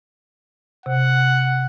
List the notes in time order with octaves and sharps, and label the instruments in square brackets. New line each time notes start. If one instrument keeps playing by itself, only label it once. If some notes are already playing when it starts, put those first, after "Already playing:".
[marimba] C3 [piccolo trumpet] F#5